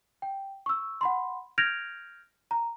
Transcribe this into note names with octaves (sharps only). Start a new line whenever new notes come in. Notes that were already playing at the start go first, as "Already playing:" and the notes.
G5
C#6 E6
F#5 B5 C6
F6 G6 G#6 A#6 D7 F7
A#5